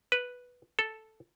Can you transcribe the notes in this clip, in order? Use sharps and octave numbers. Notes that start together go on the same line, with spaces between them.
B4
A4